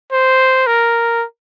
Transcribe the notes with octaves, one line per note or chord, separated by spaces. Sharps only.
C5
A#4